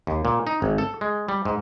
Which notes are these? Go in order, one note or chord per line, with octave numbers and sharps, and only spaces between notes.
D#2
A#2
D#4
G#1
A4
G#3
G3
G#2